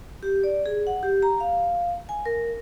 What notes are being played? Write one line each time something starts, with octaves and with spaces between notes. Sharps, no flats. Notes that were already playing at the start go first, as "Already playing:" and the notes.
G4
D5
G#4
F#5
G4
A#5
F5
G#5
A#4